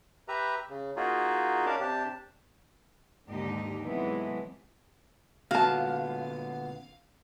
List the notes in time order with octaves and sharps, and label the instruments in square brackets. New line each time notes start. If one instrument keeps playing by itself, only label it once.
[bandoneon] G4 B4 E5 A#5
C#3
A#3 D#4 F4 F#4 G#4
C#4 D4 A#4 D5 F5 A5
C3 D4 G4 A5
[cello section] D#2 G#2 D3 D#4 G4
C3 E3 F#3 G#3 A3 B3
[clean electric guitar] A#2 D3 B3 [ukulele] F#4 A5 [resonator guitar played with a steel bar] F5